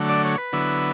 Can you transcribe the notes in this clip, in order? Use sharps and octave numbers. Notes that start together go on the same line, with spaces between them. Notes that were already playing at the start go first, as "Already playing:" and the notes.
Already playing: D3 F#3 A3
D5
C#5
B4
D3 F#3 B3 E4